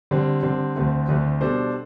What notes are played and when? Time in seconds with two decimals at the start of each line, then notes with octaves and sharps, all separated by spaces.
0.11 D3 G3 C4
0.43 D3 G3 C4
0.76 D2 D3 A3 C4
1.08 D2 D3 A3 C4
1.41 B2 G3 D4 A4 C5